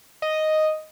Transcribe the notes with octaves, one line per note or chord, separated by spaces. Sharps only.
D#5